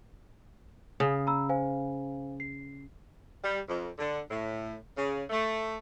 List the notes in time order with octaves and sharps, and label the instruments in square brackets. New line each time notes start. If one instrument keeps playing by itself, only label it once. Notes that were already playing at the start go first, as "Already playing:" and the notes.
[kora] C#3 [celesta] D#6
[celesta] A#5 B5 E6
C5 F5 G#5
C7
[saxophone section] G3
F2
D3
A2
C#3
A3